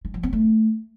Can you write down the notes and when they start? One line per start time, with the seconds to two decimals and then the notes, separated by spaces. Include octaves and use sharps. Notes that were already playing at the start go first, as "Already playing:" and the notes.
0.05 G#3
0.14 F3
0.23 B3
0.33 A3